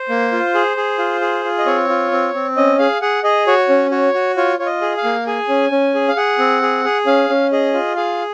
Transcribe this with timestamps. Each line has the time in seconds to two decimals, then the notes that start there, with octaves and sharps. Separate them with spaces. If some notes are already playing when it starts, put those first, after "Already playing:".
Already playing: C5
0.09 A#3
0.32 F4
0.55 G#4
0.77 G#4
0.98 F4
1.21 G#4
1.45 F4
1.59 D#5
1.66 C4 C#5
1.89 F4
2.11 C4
2.34 C4
2.57 C#4 D#5
2.79 G#4 F5
3.01 G#4 F#5
3.24 G#4 D#5
3.47 F#4 C#5
3.69 C#4
3.91 F#4 C#5
4.14 F#4
4.37 F4 C#5
4.59 F4 C#5
4.66 D#5
4.81 G#4
4.97 F5
5.04 A#3
5.27 G#4 G#5
5.49 C#4
5.72 C#4
5.95 G#4
6.08 F5
6.16 G#4 F#5
6.39 C4
6.62 G#4
6.85 G#4
7.06 C#4 F5
7.29 C#4
7.52 G#4 D#5
7.74 F4
7.96 G#4 F5